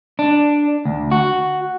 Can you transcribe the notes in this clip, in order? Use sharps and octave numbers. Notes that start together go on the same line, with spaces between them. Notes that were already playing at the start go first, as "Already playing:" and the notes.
D4
D2
F#4